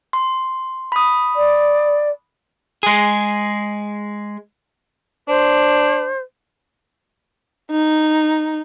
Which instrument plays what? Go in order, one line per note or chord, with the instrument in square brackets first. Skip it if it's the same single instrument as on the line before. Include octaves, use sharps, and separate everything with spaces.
[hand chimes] C6
B5 D#6
[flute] D5
[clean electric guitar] G#3 G#4
[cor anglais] D4 [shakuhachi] C5
[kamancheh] D#4